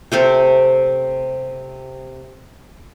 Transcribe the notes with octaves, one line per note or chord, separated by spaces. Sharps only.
C3 A3 C4